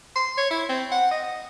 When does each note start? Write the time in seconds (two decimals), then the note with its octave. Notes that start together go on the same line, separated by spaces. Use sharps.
0.16 C6
0.38 C#5
0.51 E4
0.69 C4
0.92 F#5
1.11 D#5
1.24 D#5